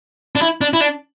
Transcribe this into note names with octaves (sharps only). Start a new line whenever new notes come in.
D4
E4
D4
E4
D4